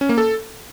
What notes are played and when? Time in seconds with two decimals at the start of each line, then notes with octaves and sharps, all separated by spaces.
0.01 C#4
0.09 A#3
0.18 A4